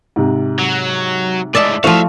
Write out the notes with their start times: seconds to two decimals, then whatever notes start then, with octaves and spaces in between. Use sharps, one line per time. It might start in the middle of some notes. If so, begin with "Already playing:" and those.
0.16 G#2 C3
0.59 F#3
1.55 A2 G#3 D5 E5 A5
1.84 F3 A3 E4 F#4 C5 E5 F5